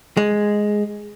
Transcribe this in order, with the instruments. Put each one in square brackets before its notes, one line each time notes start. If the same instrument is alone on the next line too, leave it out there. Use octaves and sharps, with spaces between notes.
[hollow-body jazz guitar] G#3